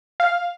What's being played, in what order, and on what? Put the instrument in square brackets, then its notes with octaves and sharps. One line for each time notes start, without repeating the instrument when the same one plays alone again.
[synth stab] F5